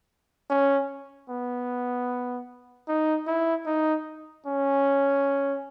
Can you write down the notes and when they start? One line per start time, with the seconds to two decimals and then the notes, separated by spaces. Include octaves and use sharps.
0.50 C#4
1.29 B3
2.88 D#4
3.27 E4
3.66 D#4
4.46 C#4